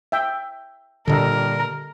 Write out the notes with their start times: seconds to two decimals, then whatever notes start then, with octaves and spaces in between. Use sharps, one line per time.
0.12 E5 G5
1.08 A#2 D3 G3 A4 A#4 D#5 A5